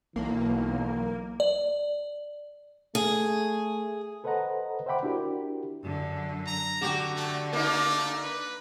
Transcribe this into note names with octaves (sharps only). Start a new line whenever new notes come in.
B1 E3 A#3
D5
A3 G#4
A4 B4 C5 D#5 F#5 A#5
C5 E5 F#5 G5 B5 D6
D4 E4 F#4 G4 A#4
F#2 D3
A#5
D3 F#4 G4
A3
A3 A#3 D#4
B4